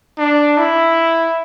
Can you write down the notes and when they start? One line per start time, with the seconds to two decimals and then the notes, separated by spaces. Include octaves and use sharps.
0.18 D4
0.58 E4